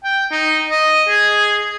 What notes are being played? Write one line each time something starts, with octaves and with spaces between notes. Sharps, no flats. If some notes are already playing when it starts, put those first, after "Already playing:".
G5
D#4
D#5
G#4